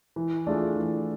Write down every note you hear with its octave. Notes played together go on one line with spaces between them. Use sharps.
E3
A3 D4 F4 G#4
E3